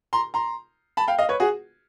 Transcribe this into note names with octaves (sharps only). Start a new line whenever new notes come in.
A#5 C6
A#5 C6
A5 B5
F5 G5
D#5 F5
B4 C#5
F#4 G#4